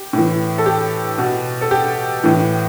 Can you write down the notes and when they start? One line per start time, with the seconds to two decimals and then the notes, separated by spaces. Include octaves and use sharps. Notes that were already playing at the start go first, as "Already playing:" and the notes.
Already playing: G4
0.13 A2 E3
0.58 A4
0.66 G4
1.18 B2
1.61 A4
1.71 G4
2.24 A2 E3